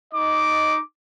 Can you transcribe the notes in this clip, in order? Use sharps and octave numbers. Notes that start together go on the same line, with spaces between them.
D#4 D#5 D6